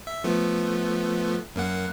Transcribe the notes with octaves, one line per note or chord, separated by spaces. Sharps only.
E5
F3 A3 B3
F#2 A#3 F#5